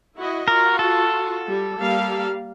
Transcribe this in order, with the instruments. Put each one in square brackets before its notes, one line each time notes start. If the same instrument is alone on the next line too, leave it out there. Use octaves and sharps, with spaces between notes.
[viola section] E4 F#4 D#5
[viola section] F4 F#4 [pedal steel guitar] A#4
[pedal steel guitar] A4
[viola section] G3
G3 A#3 F5